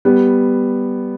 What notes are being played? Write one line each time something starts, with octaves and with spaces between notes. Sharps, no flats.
G3 B3